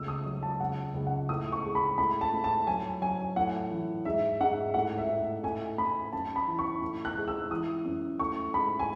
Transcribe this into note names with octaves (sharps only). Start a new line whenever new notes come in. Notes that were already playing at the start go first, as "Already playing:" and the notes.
Already playing: C#2 A3 E6
D#6
F#3
A5
C#2 F#5
C#2
F#5
A2 D#6
C#6
G#3
B5
A2 B5
A5
A2
A5
F#3 G#5
F#3 G#5
A2 F#5
E3
G#2 E5
G#2 F#5
A2 F#5
E5
A2
A2 G#5
A2 B5
F#2 A5
B5
E3
C#6
A2
F#6
G#3
E6
E3 D#6
F#2
A3 C#6
G#2 B5
G#5